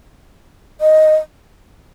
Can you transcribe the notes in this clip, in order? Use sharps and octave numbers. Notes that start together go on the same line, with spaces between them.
D#5